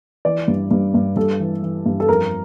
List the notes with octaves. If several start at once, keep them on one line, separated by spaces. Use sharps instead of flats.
E3 D5
G2
G2
G2
G2 A4
E3
E3
G2
A4
F2 A#4